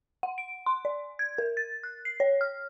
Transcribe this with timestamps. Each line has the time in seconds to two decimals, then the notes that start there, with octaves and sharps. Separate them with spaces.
0.23 F#5
0.38 D7
0.66 C6
0.85 D5
1.19 G#6
1.38 A#4
1.57 A6
1.84 F#6
2.05 C7
2.20 C#5
2.41 F6